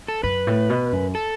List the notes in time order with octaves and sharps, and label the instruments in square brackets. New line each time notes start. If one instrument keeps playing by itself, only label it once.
[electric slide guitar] A4
[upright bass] F#2 [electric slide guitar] B4
[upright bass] A2
B2
F#2
[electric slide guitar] A4